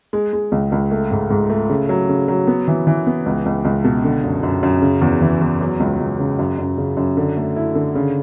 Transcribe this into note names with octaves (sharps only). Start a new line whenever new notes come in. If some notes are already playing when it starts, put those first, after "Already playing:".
G#3
G#3
C#2
C#2
A3
G#2
G#2
A3
C#3
F#3
C#3
F#3
B3
E3
E3
B3
C#2
C#2
C#2
B2
D3
F#2
F#2
F#2
C#3
E2
E3
E2
F#3
C#2
C#2
C#3
F#2
F#2
C#3
F#2
D3
A3
E4
D3
C#3